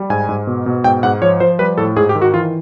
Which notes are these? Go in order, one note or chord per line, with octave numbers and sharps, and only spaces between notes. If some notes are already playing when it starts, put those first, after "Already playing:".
Already playing: G3
G#2 G#5
G#2
B2
B2
G#2 G5
G#2 F#5
F3 C#5
F3 C5
G3 B4
A2 A4
G#2 G#4
G4
D#3
F#4
E3 F4